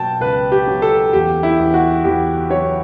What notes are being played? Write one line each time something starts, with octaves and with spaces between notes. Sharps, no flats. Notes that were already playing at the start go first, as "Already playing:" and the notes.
Already playing: B2 F#3 G5 A5
C#2 B4
G4
F#3
A4
E2 G4
E4
E2
F#4
E2 G4
F#3 C#5